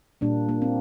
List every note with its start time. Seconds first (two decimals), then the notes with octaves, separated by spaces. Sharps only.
0.21 A#2 G3 A#3 D4
0.49 A#3
0.62 C4